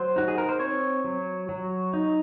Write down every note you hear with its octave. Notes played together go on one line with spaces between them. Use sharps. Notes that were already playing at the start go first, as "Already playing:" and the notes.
Already playing: F#3 C5
D#4 F#4
G#4
A#4
C5
C4 C#5
F#3
F#3
D#4